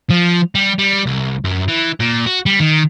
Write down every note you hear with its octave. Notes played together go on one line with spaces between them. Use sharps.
F3
G3
G3
C2
F#2
E3
A#2
F#4
G3
D#3